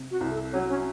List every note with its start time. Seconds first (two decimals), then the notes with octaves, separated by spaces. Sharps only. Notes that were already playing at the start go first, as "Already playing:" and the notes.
Already playing: C3
0.10 F#4
0.21 C2
0.31 A4
0.53 F#3 C#4 C#5
0.69 C#4 C#5